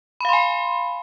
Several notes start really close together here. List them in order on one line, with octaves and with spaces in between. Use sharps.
B5 F5 C6 G#5